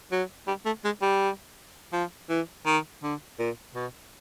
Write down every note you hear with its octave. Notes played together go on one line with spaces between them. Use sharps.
F#3
G3
A3
G#3
G3
F3
E3
D#3
D3
A#2
B2